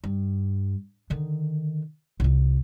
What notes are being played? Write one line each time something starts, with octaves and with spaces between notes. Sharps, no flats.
G2
D3 D#3
C2 F4